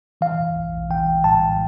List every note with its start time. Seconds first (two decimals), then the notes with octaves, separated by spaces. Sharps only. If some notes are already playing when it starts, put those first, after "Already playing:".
0.21 E3 F5
0.56 A#1
0.90 E3 G5
1.24 A2 A5